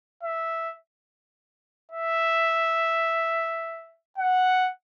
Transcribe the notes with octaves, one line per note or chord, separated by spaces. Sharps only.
E5
E5
F#5